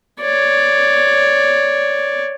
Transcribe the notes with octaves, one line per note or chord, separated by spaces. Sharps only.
C#5 D5